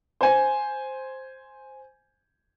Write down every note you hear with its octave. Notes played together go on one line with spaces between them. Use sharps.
C5 G#5